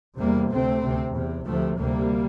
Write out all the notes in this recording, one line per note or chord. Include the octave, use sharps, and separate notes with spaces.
E2 C3 G3 A#3
D2 C3 A3 C4
D2 C3
E2 C3
D2 C3 F3 A3
D2 C3 G3 A#3